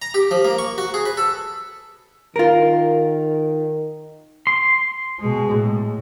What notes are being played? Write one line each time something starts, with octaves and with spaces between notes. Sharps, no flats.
A#5
G4
F3
A#3
C#6
F#4
G#4
B4
A4
D#3 F4 A#4
C6
B2 G#3
A2